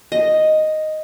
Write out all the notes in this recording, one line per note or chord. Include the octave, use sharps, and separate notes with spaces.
D#5